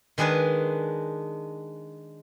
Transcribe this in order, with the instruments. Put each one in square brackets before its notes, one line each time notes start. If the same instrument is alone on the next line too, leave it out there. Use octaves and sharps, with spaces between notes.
[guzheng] D#3 G#3 D4 G#4 B4